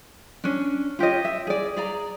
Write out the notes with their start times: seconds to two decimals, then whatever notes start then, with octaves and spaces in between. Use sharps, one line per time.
0.44 C#4 D4
0.99 F4 G4 C#5 D#5
1.25 E5
1.47 G#4 D5
1.77 G#4 D5 A#5